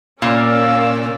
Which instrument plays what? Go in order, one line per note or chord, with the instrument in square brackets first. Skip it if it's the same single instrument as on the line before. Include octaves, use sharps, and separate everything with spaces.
[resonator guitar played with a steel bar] A#2 [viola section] C#4 A#4 D5 [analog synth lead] F5 [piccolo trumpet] E6